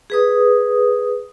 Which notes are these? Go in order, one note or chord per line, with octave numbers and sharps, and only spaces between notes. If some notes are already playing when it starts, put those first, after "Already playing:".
G#4 B4 D#6